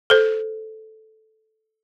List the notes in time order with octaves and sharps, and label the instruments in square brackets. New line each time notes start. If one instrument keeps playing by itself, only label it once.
[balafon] A4 C5